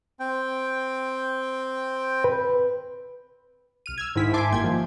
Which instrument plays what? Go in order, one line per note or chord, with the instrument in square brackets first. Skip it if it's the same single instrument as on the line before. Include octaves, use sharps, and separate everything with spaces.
[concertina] C4 G5
[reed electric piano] B4
[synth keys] C2 F6 D#7
E6 F6 G#6
G#2 D#3 E4 B6
E5 G#5 A5 C6 D6
G1 G2 A#3 G5 G#6
D#3 F3